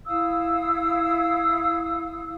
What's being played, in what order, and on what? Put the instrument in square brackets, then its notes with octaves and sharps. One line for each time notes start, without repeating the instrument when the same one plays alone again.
[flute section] E4 F5 D#6 E6